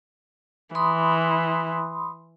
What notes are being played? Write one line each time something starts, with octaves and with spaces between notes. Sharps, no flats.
E3 B5 C6 D#6